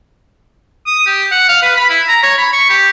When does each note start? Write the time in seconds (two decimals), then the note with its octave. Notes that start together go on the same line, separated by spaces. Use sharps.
0.87 D#6
1.06 G4
1.32 F#5
1.49 F5
1.63 B4
1.77 B5
1.90 E4
2.08 A#5
2.23 C#5
2.38 B5
2.53 C#6
2.70 G4